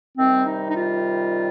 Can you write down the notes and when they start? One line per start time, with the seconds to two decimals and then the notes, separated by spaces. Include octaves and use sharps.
0.18 C3 D#3 G3 C4
0.47 D#4
0.70 D#4
0.76 F4